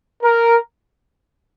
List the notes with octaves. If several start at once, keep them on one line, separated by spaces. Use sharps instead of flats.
A#4